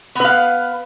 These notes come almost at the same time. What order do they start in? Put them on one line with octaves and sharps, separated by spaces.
B3 B4 F5